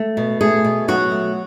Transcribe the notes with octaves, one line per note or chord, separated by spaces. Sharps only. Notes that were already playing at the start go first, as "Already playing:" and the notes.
Already playing: A3
B2
A3 G#4
B2
F#3 F#4
A3